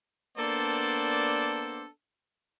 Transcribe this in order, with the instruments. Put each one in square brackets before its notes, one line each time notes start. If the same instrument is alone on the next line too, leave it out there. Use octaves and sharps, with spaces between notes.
[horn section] A#3 B3 D4 A4 C5 D5